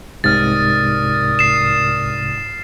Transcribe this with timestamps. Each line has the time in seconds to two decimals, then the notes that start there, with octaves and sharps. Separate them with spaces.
0.24 C2 G#2 C3 A#4 D5 D#6 F6 A6
1.39 C7 E7